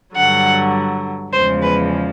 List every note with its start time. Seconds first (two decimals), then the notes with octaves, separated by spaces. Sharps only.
0.16 G2 D3 F#3 F#5
1.33 E2 C#3 F3 G#3 C5
1.62 B4